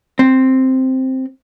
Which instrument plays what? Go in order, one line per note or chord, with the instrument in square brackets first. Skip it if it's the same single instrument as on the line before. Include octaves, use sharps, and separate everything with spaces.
[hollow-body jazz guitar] C4